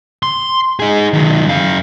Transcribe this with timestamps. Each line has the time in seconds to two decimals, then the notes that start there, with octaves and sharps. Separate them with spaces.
0.23 C6
0.80 D#4 G#4
1.14 D#3 F#3
1.46 F#2 F5